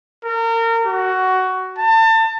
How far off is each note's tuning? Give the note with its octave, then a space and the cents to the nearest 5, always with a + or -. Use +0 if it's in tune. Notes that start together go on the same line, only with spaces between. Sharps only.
A#4 -30
F#4 +15
A5 +30